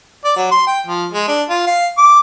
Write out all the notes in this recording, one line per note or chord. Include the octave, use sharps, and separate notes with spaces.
D5
F#3
C6
G5
F3
G#3
D4
F4
F5
D6